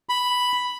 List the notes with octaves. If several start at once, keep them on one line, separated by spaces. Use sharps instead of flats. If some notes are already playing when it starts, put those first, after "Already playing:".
B5